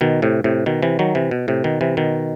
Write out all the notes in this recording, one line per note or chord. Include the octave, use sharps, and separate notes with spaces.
B2 D#3
A2 C3
A2 C3
B2 D#3
C3 E3
D#3 F#3
C3 E3
B2
A2 C3
B2 D#3
C3 E3
B2 D#3